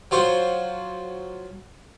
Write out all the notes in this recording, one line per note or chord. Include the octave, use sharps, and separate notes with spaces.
F#3 F4 C5